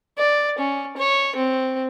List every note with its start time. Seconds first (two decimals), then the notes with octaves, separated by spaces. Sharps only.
0.18 D5
0.59 C#4
0.97 C#5
1.36 C4